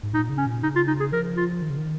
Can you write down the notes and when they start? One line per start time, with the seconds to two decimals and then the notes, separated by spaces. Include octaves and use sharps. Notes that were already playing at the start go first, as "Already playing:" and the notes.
0.03 G#2
0.14 A#2 D#4
0.29 C#3
0.38 C#4
0.46 A#2
0.63 C#3 D#4
0.76 F4
0.88 D#4
1.00 G#4
1.12 F3 A#4
1.37 F4
1.62 D#3
1.70 C#3
1.78 D#3